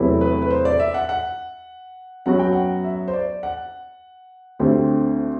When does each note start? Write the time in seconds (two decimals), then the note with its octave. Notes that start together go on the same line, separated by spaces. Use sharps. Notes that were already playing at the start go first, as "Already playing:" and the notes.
Already playing: E2 C3 F#3 A3 E4
0.21 B4
0.42 B4
0.51 C5
0.65 D5
0.80 E5
0.94 F#5
1.09 F#5
2.26 F#2 F#3 B3 F#4 F#5
2.39 G5
2.53 F#5
2.84 E5
3.08 C5
3.13 D5
3.43 F#5
4.59 D2 D3 A3 C4 G4